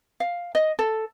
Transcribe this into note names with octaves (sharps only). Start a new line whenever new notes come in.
F5
D#5
A4